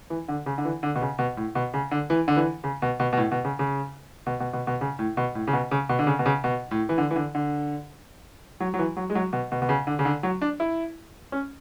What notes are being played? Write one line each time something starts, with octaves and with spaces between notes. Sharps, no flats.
E3
D3
C#3
D3
E3
D3
B2
C#3
B2
A2
B2
C#3
D3
E3
D3
E3
C#3
B2
B2
B2
A2
B2
C#3
C#3
B2
B2
B2
B2
C#3
A2
B2
A2
C#3
B2
C#3
B2
D3
C#3
B2
C#3
B2
A2
E3
D3
E3
D3
D3
F#3
F#3
E3
F#3
G#3
F#3
B2
B2
B2
C#3
D3
C#3
D3
F#3
D4
E4
C#4